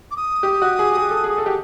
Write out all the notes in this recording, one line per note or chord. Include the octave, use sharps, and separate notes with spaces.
D6
D#6
G4
F#4
G#4
G#4
A4
G#4
A4
G4